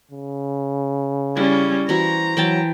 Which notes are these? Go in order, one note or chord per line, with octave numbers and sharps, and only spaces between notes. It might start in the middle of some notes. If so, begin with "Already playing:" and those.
C#3
G3 C#4 E4
E3 F#4 C5 A#5
E3 F#3 G5 A5